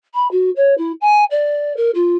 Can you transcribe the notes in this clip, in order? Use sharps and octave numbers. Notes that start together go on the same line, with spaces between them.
B5
F#4
C#5
E4
G#5
D5
A#4
F4